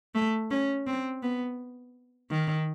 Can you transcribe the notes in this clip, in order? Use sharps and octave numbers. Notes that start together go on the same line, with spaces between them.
A3
C#4
C4
B3
D#3